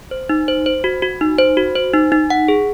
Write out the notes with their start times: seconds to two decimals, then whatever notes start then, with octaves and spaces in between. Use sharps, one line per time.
0.11 C5
0.29 D#4
0.48 C5
0.66 C5
0.84 F#4
1.02 F#4
1.21 D#4
1.39 C5
1.57 F#4
1.75 C5
1.94 D#4
2.12 D#4
2.30 F#5
2.48 G#4